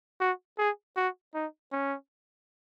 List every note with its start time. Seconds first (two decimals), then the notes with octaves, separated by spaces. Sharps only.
0.20 F#4
0.58 G#4
0.97 F#4
1.35 D#4
1.72 C#4